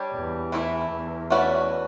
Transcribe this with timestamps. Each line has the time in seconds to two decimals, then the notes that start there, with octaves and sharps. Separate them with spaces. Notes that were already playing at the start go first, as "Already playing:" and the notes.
Already playing: G3 D4 G4 C#5
0.13 E2
0.52 E3 A3 E4
0.91 E2
1.30 A3 C#4 F#4 B4 D5